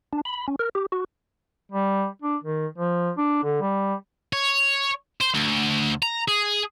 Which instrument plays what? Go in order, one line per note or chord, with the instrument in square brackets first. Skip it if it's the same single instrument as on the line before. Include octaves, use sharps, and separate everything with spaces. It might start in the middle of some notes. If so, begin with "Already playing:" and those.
[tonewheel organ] D4
B5
C#4
A#4
G4
F#4
[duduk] G3
D4
D#3
F3
D4
D3
G3
[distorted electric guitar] C#5
C5
D2
A#5
G#4